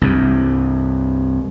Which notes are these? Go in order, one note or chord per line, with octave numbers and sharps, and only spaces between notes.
C2 G2